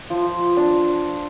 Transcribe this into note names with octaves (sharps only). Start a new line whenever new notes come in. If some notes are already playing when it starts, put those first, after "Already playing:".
F3
D4